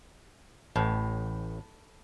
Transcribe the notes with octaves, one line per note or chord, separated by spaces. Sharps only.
A1 A2